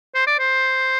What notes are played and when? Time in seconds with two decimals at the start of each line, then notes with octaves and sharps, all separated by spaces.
0.15 C5
0.27 D5
0.39 C5